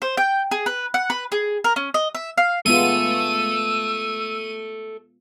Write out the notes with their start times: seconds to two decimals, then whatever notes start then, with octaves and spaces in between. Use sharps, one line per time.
0.02 C5
0.17 G5
0.51 G#4
0.66 B4
0.94 F#5
1.10 B4
1.32 G#4
1.64 A#4
1.76 C#4
1.94 D#5
2.15 E5
2.38 F5
2.66 G#3 B3 F4 A4 E5 E6 D#7